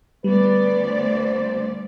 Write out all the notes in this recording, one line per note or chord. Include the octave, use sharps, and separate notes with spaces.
D2 G3 B3 B4 D5
C5